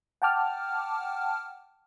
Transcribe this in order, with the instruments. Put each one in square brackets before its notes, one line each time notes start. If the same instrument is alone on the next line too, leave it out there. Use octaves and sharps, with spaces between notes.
[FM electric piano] F#5 G5 A5 D6 F6